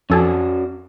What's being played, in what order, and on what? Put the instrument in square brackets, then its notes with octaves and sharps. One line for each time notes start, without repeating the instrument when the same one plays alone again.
[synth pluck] F2 A4 G#5 [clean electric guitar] C#4 F#4 D5